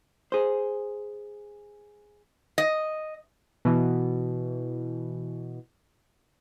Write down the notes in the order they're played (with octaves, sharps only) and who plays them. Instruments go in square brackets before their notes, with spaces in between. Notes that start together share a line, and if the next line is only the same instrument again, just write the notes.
[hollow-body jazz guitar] G#4 C5
[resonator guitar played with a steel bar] D#5
[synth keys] B2 E3